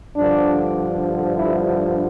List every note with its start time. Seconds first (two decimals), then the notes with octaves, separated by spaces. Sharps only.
0.16 G2 D3 F3 D4
1.38 E4